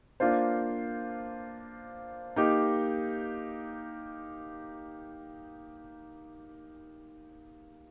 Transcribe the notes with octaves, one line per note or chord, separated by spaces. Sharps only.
A#3 D4 F4 C5
A#3 D#4 G4